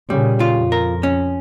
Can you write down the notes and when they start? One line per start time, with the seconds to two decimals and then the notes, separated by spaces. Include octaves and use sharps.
0.10 A#2 C#3 G3
0.40 F4
0.56 F2
0.72 A#4
1.03 C#4